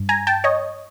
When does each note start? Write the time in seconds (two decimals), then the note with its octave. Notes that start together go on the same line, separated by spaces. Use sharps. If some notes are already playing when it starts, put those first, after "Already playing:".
Already playing: G2
0.09 G#5 A#5
0.27 G5 A5
0.44 C#5 D#5